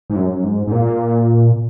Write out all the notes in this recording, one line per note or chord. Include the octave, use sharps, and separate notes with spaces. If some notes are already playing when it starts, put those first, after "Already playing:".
G#2
F#2
G#2
G#2
A#2